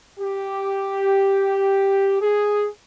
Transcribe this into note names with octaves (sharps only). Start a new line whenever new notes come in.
G4
G#4